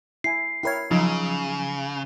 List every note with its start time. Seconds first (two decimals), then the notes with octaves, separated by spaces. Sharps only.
0.24 E4 G#5 C7
0.63 E4 A#4 C#5 G5 B5 G#6
0.91 C#3 F3 F#3 D#4 F4